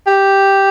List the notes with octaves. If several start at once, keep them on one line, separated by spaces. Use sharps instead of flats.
G4